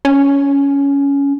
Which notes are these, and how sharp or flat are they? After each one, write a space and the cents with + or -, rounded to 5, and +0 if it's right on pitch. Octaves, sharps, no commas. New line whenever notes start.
C#4 +15